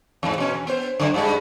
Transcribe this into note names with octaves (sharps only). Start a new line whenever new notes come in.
E2 G#2
B2 C#4
E2
B3 C5
F#2 D3
G2 G3 G#3